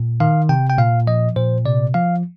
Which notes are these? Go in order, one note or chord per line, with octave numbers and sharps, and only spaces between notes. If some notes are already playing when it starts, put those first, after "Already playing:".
Already playing: A#2
D#3 F5
C3 G5
G5
A#2 F5
F3 D#5
A#2 C5
C3 D5
F3 F5